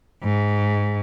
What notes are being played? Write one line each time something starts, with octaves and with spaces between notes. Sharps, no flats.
G#2